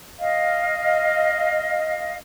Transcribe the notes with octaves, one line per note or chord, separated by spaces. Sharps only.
D#5 F5